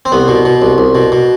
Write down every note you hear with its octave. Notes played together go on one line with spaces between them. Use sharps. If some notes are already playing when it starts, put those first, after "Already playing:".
C4
C2 B3
B2
B2
C2
C2
B2
B2